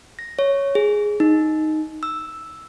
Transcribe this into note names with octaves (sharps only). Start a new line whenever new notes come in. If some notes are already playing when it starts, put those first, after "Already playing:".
A#6
C#5
G#4
D#4
E6